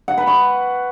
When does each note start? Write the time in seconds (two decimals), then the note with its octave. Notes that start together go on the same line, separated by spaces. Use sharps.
0.08 F#5
0.18 B4
0.27 C#6